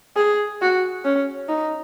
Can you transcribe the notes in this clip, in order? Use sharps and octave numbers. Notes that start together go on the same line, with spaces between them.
G#4
F#4
C#4
D#4